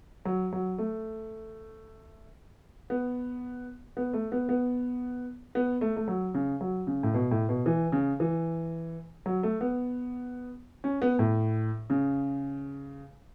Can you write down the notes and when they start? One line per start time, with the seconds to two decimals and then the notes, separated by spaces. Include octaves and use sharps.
0.25 F#3
0.53 F#3
0.78 A3
2.90 B3
3.97 B3
4.13 A3
4.32 B3
4.49 B3
5.55 B3
5.81 A3
5.97 A3
6.08 F#3
6.34 C#3
6.61 F#3
6.87 C#3
7.03 A2
7.14 B2
7.31 A2
7.49 B2
7.66 E3
7.92 C#3
8.20 E3
9.26 F#3
9.43 A3
9.61 B3
10.84 C#4
11.02 B3
11.19 A2
11.90 C#3